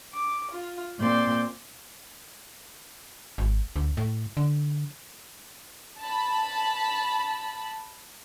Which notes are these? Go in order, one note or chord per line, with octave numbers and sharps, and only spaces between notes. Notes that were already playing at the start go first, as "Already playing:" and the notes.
D6
F4
A#2 C4 D5 C6 G6
G#1
D2
A2
D3
A5 B5